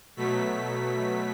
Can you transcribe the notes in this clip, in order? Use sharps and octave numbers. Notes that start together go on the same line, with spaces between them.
B2 F#3 A3 B6